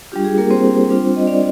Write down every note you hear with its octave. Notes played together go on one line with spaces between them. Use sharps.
G3 D4 F4 G4
G#4
A#3 A#4
C4 C5
G3 D4 F4
D#5
D4 D5